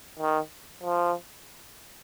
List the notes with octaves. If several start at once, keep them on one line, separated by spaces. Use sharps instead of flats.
D#3
F3